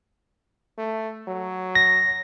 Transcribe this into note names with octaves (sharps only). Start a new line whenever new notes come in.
A3
F#3
A#6